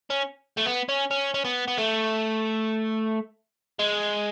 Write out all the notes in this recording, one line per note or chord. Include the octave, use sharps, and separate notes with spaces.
C#4
A3
B3
C#4
C#4
C#4
B3
B3
A3
G#3